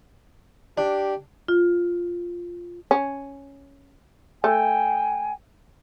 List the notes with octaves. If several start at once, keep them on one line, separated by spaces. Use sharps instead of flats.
D4 G4
F4
C#4
A3 G5 G#5